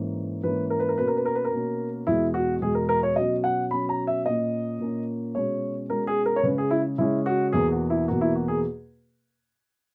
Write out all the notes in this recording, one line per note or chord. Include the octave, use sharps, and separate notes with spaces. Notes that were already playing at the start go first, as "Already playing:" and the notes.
Already playing: G#2 E3 A#3 C#4
G#2 E3 A#3 C#4 B4
A#4
B4
A#4
B2 A#3 C#4 B4
A#4
B4
A#4
B4
A#4
B2 A#3 C#4
E2 B2 G#3 E4
F#4
E2 B2 G#3 G#4
A#4
A#4
C#5
B2 F#3 C#4 D#5
F#5
B2 F#3 C#4 B5
A#5
E5
A#2 A#3 C#4 D#5
A#2 A#3 C#4
B2 G#3 C#4 C#5
B2 G#3 C#4 A#4
G#4
A#4
C#5
C#3 G#3 C#4 B4
G#4
E4
C#3 G#3 C#4 E4
F#4
E2 B2 A#3 G#4
F#4
E4
E2 B2 A#3 F#4
E4
F#4
G#4